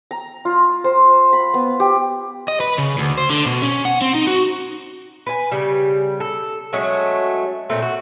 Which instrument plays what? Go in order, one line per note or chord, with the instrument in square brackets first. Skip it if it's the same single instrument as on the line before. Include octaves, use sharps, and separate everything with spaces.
[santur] A#5
F4
C5
B5
B3
G4
[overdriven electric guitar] D#5
B4
C#3
D2
C5
D3
B2
C#4
F#5
C4
D#4
F#4
[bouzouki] B4 G#5
C#3 G3
A4
F#3 G#3 A3 C#4
A#2 A3 C4
F#4